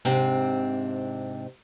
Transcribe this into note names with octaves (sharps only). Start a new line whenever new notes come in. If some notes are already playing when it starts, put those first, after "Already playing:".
G#2 C3 C4 D4